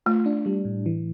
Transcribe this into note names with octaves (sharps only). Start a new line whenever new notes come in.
A3 F4
D4
G3
A2
E3